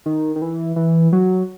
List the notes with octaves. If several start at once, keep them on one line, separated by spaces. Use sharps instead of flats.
D#3
D#3
E3
E3
F#3